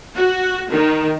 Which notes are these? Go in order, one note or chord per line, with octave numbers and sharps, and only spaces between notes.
F#4
D#3